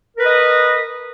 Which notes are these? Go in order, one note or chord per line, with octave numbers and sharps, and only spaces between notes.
A#4 B4 D#5